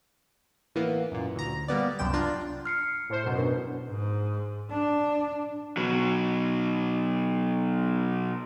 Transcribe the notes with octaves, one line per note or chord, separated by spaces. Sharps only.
A2 E3 A#3 B3
F#2 A#2
D2 A#5
G3 A#3 B3 D5
C2 F#2 G5 E7
D4 F4 A#5
F6 C7 C#7
A2 C5
F#2 B2
D4 A#4 B4
G#2
D4
B2 F#3